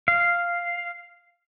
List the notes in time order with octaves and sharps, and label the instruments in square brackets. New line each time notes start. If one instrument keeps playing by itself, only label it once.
[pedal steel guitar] F5